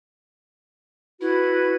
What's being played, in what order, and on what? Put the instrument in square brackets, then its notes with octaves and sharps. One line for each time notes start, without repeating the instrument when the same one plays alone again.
[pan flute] E4 [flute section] F#4 B4 G#6